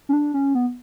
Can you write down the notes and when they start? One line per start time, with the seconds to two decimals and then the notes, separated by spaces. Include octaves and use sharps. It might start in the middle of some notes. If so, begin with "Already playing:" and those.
0.09 C#4
0.13 D4
0.34 C#4
0.55 B3